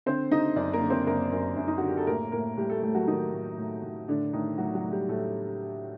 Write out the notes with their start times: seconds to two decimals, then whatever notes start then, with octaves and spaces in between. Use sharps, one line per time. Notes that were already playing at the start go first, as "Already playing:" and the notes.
0.06 D3 C4 C5
0.31 D3 D#4 D#5
0.56 F#2 D4 D5
0.73 A#3 A#4
0.82 D3
0.90 C4 C5
1.06 F#2 A#3 A#4
1.32 F#2
1.56 F#2
1.68 D#4
1.78 D3 F#4
1.88 G4
1.97 A4
2.07 A2 A#3 A#4
2.32 A2 A#3 A#4
2.57 A2 G3 G4
2.70 A3 A4
2.82 A2 A3 A4
2.95 F#3 F#4
3.08 A2 D#3 D#4
3.33 A2
3.57 A2
3.83 A2
4.08 A2 D3 D4
4.33 A2 D#3 D#4
4.58 A2 F#3 F#4
4.75 F#3 F#4
4.83 A2
4.92 G3 G4
5.09 A2 A3 A4